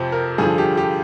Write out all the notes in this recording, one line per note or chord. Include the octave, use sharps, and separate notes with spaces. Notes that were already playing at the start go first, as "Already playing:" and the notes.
Already playing: F2 C3 F3 C5
A#4
G2 D3 F3 G#4
G4
G4